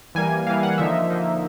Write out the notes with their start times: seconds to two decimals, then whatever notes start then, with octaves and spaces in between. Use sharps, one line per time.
0.15 E3 G3 A#3 G#5
0.47 E3 G3 A#3 F5
0.63 F#5
0.78 D3 F3 A#3 D#4 E5
1.10 D3 F3 A#3 D#4